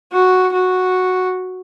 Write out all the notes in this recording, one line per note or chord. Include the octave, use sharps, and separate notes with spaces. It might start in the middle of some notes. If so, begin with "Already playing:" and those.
F#4
F#4